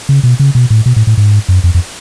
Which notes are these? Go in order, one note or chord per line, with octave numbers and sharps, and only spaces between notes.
C#3
B2
C#3
B2
A2
B2
A2
A2
G#2
F#2
F2
F2